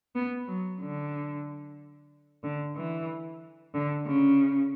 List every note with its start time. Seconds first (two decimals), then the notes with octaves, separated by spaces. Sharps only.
0.15 B3
0.48 F#3
0.81 D3
2.44 D3
2.76 E3
3.74 D3
4.07 C#3